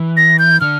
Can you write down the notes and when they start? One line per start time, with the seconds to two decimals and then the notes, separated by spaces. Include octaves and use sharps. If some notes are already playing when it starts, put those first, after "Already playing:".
Already playing: E3
0.17 A#6
0.39 G6
0.61 D3 F6